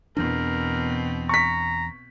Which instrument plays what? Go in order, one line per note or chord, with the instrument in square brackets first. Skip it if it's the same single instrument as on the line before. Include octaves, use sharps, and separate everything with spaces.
[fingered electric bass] E2 E3 D4 [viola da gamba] B2 C4 [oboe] A#4
[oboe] A#5 [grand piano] C#6 B6